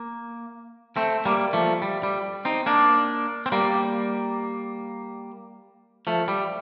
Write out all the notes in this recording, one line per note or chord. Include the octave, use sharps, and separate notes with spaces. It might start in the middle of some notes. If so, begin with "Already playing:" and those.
Already playing: A#3
A3 C4
G3 A#3
F3 A3
G3
G3
C4 D#4
A#3 D4
C4
G3 A#3
F3 A3
G3